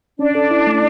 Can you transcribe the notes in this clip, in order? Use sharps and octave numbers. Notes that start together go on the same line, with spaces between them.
C#4 D4 D5
A4
E4
A3